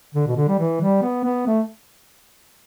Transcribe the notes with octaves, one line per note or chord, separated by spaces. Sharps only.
D3
B2
D3
G3
E3
G3
B3
B3
A3